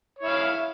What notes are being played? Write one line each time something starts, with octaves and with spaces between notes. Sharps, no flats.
E4 C#5 F5